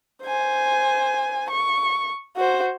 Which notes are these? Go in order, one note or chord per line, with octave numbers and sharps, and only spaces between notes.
C5 G#5
C#6
F#4 C5